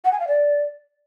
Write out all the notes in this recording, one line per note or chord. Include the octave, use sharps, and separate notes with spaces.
F#5
G#5
F5
D5